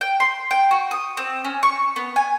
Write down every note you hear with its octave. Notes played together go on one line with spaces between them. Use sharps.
G5
C6
G5
F#4
D#6
C4
C#4
C#6
B3
G#5